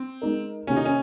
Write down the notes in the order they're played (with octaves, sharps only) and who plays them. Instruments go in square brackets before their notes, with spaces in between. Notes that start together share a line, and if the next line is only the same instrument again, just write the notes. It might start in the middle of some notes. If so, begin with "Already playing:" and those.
Already playing: [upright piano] C4
[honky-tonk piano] G#3 D#4 A#4
[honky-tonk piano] C3 D#3 A#3 [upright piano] C#4
[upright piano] D#4
C#4